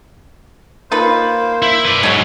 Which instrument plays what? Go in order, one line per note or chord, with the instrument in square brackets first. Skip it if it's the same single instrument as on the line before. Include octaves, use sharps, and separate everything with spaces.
[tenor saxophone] A#3 [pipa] D#4 F4 B4 [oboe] C5
[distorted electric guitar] E4
B4 D5
[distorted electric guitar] G#2 F#3 [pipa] G#3 C#5